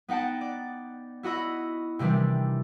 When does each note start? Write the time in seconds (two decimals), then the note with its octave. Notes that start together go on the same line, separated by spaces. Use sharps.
0.08 B3 D#4 F#5 G5 A5
0.41 D5
1.23 E4 F#4 D#5 B5 E6
1.99 C3 D#3 E3 G3 D4